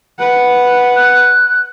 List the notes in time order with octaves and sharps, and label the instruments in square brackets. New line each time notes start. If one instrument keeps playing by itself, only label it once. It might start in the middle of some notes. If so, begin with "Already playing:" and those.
[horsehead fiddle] B4 F#5
[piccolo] F#6